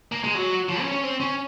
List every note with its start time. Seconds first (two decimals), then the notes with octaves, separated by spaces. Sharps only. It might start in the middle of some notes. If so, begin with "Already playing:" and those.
0.12 A#3
0.24 G#3
0.34 F#3
0.69 F3
0.80 C#4
0.92 C#4
1.03 C4
1.20 C#4